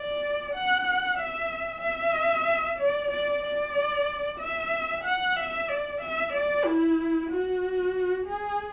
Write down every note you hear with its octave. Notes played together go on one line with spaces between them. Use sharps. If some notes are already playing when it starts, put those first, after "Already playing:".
Already playing: D5
F#5
E5
E5
D5
D5
D5
E5
F#5
E5
D5
E5
D5
E4
F#4
G#4